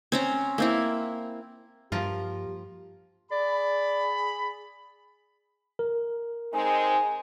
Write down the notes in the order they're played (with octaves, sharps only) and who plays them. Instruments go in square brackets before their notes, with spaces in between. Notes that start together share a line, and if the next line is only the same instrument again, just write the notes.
[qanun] C4 C#4 A#5
A#3 C4 E4
[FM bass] G2 [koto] F3 A#3 F4 [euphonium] G4
[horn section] G#4 B5 [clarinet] D5
[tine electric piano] A#4
[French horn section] G#3 C4 D#4 [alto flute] G#5